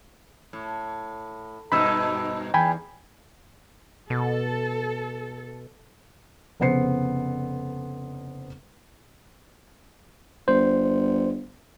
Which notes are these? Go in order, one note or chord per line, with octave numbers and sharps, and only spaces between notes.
A2
G2 B2 D#4 B5 E6
E2 G5 G#5 B5
B2 A4
F1 C#3 B3 C5 C7 C#7
G1 C5